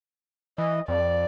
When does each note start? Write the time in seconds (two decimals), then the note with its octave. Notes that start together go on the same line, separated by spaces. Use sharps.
0.58 E3 D#5
0.88 F2 D5